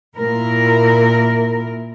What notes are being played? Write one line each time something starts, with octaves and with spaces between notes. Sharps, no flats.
A#2 E4 A#4